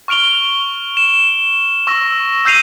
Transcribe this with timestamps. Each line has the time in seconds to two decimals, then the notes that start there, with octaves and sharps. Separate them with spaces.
0.08 C#6 F6 D7 F7 G7
0.97 E7
1.87 C#6 E6 A#6
2.45 E6 G6 C7 D#7 F7